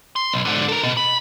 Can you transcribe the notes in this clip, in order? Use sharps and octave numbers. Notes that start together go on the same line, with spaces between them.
C6
B1
G#2 D3
A4 A#4
B2
B5